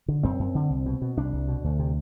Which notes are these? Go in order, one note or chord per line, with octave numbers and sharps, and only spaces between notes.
D3
F#2 C4
F#2
D3
C2
B2
B2
C2 D4
C2
B2
D2
C3